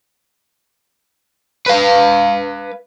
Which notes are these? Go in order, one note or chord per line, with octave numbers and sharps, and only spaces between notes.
B4 F5